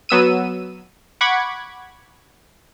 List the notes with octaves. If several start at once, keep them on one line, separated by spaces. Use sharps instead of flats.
F#3 B3 E6 D#7
F#5 B5 C#6 D6 G#6